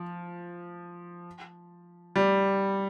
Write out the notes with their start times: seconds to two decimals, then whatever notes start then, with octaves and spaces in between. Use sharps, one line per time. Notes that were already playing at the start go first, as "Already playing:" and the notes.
Already playing: F3
2.16 G3